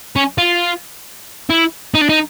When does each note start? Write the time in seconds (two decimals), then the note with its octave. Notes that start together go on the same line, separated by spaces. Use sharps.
0.16 C#4
0.38 F4
1.50 E4
1.94 D#4
2.01 D4
2.09 D#4